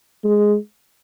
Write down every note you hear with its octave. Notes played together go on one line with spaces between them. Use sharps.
G#3